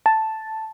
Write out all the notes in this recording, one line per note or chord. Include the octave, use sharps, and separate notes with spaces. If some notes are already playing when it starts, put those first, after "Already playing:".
A5